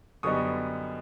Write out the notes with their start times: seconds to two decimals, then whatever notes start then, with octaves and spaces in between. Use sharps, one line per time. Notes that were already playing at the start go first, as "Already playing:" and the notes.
0.23 F#2 D3 G3 B3 D#4 C#6 D#6